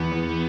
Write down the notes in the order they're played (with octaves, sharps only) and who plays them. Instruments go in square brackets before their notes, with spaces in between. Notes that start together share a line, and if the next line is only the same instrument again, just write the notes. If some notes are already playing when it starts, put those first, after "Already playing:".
Already playing: [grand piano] E2 [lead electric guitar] B3
[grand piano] E2